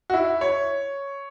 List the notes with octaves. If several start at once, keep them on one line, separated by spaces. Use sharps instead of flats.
F#4
E4
C#5